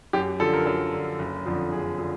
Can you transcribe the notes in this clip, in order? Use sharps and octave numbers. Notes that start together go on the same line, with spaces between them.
F#2 G4
D3 F3 A4
A#4
F#2 A4
D3 F3
F#1
F2 D3 F3
F#1 G#4
D3 F3